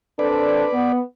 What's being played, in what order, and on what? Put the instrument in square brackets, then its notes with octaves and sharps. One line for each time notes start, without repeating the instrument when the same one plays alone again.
[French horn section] C4 D4 A4 [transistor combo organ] B4 D5
[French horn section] B3